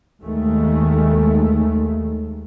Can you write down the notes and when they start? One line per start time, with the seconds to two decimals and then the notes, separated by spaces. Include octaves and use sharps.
0.22 D#2 D#3 G#3 A3